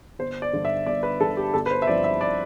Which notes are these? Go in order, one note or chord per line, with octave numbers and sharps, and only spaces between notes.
G1 C5
D5
G2 D3
E5
G1 D5
B4
G2 D3 A4
G4
G1 A4
B4
C5
E5
G2 F3 C4 E4 D5
E5
D5